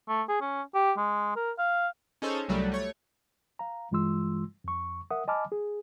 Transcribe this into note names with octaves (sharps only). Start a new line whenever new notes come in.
A3
G#4
C#4
G4
G#3
A#4
F5
C#4 D#4 G#4 A4 C5 C#5
C2 F#3 G3 A3
A3 C#5
F5 A#5
G2 E3 G#3 F4 C6 E6
F2 C#6
A#4 E5 F#5 D#6
D#5 G#5 A5 B5 D6 F6
G#4